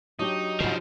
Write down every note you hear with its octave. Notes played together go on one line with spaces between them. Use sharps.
F#3 D4 D#4 G4
G#2 C#3 F3 G3